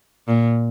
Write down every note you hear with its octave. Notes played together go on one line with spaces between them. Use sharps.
A#2